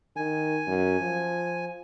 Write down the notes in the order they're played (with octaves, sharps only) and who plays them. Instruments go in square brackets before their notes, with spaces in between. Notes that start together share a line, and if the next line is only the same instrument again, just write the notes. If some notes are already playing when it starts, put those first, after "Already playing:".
[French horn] D#3 [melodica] G#5
[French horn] F#2
F3